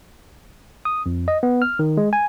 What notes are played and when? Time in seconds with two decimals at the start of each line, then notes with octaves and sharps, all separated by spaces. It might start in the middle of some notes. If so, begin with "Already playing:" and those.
0.85 D#6
1.06 F2
1.28 D#5
1.43 B3
1.62 F6
1.79 D#3
1.97 G#3
2.13 G#5